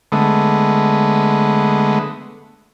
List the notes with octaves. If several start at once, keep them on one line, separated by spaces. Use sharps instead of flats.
D3 G#3 A3 B3